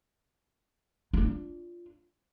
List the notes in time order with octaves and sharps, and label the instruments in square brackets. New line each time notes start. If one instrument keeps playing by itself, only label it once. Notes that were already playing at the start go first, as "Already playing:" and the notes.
[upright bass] D4 F4